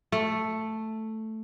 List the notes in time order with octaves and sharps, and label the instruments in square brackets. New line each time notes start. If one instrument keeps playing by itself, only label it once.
[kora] A3